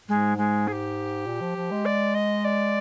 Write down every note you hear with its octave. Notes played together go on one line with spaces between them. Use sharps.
G#2 G#3
G#3
G#4
G4
A#2
F3
F3
G#3
D5
D#5
D5